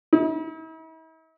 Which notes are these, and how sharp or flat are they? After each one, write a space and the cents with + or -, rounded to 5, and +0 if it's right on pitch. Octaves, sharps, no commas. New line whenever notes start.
E4 -45